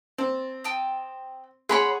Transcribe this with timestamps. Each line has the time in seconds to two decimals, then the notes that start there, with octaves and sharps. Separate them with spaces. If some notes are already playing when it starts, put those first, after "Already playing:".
0.18 C4 A5
0.64 G5 A5 D#6
1.69 G#4 C#5 F#5 B5 C6